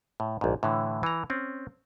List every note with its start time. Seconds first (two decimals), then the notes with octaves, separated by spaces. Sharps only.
0.20 A2
0.41 A#1 G#2
0.63 A2 D3 E3
1.03 E3 A#5
1.30 C4 C#4